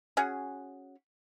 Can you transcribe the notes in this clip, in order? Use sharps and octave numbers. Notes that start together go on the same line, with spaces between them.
C#4 F#4 G#4